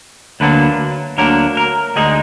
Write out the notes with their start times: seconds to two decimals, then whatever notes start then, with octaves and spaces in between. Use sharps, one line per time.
0.40 D2 D3 F#3 A#3 D4 B4
1.18 D2 D3 F#3 A#3 D4 A#4
1.57 A#4
1.96 D2 D3 G#3 D#4 G#4